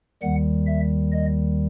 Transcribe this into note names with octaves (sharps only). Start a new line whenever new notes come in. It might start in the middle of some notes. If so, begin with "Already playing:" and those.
D#2 D#3 G3 F#5
E5
D#5